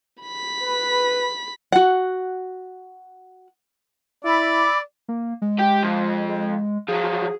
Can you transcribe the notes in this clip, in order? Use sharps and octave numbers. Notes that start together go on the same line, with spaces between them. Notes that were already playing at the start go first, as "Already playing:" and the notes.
B5 B6
B4
F#4 F#5
E4 D5 B5 D6 E6
A#3
G#3
G4
F2
G#3
F3 F#3 G#4